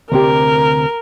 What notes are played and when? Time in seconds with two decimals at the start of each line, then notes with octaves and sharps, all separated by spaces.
0.12 D2 C3 G4 A#4